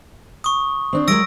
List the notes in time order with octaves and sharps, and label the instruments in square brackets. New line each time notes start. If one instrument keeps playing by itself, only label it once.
[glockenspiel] C#6 D#6
[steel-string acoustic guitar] C4 D4 C5
[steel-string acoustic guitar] F#3 G#3 A#4 [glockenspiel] E6 A#6 D7